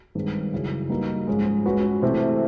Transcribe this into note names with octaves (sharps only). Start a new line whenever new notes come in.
G2 D#3 G#3 C4
F#2 C#3 E3
G3 A#3 D#4 F#4 B4
G#2 F3 G#3 C#4
G#3 C#4 F#4 B4
C3 E3 A3 C4